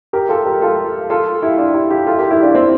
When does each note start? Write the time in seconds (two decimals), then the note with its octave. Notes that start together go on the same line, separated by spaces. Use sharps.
0.13 G4 A#4
0.29 F4 A4
0.46 G4 A#4
0.62 F4 A4
1.10 F4 A4
1.42 E4 G4
1.58 D4 F4
1.74 E4 G4
1.90 E4 G4
2.06 F4 A4
2.18 G4 A#4
2.31 E4 G4
2.42 D4 F4
2.55 C4 E4